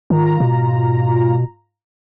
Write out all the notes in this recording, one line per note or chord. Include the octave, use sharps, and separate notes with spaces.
G#2 D#3 F4 A#5
B2